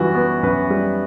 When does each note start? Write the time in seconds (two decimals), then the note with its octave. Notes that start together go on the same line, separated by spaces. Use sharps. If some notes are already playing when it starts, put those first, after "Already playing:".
Already playing: F#2 E3 G3 F#4
0.15 B3
0.43 F#2 B4
0.70 G3